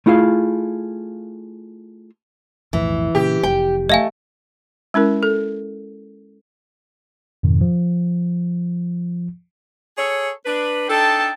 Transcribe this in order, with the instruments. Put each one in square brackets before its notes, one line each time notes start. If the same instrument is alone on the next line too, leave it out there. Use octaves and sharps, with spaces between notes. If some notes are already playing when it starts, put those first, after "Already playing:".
[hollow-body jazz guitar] A3 E4 F4 G#4 F5
[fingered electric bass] B1 F2 A2 [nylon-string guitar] E3
[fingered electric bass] A#2 C#3 [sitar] G4
[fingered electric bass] F1 [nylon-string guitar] G5
[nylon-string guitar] A3 [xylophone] D#5 F5 G#5
[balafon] G#3 C#4 E4 A#4
A4
[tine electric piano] F2 G#2 B2 D#3
F3
[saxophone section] G#4 A4 C#5
D4 B4
[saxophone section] D4 D#4 A4 [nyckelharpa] G5 A5